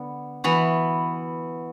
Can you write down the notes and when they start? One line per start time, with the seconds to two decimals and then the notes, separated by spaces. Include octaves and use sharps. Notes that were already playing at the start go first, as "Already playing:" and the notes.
Already playing: D3 B3
0.44 E3 B3 F#4